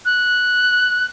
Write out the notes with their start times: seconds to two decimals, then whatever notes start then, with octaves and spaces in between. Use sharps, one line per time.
0.05 F#6